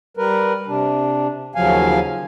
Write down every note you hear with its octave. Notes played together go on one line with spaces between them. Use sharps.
G3 A#4 B4
C3 D4
D#2 C#3 F3 F#3 F5 G#5